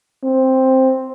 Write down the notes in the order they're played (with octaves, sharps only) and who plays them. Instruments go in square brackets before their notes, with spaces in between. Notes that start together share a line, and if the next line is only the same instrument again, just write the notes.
[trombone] C4